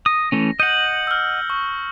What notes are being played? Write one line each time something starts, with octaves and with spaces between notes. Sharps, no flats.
D#6 A#6
E3 A3 C#4
D#5 F#5 G6 C#7 F#7
E6 F6
C#6